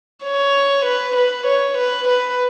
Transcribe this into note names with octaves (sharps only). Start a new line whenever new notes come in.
C#5
B4
B4
C#5
B4
B4